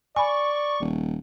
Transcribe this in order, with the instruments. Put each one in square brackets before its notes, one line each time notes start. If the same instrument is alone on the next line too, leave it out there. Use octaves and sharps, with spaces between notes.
[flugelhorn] D5 [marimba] G#5 B5 [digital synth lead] C#6
[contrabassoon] D#1